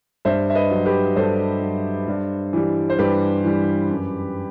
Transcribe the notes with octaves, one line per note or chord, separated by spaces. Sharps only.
G2 C5 E5
E5
B4 D#5
F#3
G4 B4
G2 A4 C5
F#3
G2
E3 G3
C5
G2 G4 B4
E3 G3
F#2